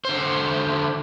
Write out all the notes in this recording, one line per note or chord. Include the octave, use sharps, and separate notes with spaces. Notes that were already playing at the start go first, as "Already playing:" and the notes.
D3 C5